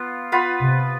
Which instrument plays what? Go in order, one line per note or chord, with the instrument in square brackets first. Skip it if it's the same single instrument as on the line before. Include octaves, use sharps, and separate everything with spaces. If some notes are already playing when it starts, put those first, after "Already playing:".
Already playing: [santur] B3 F4
B3 F4 B4
[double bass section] C3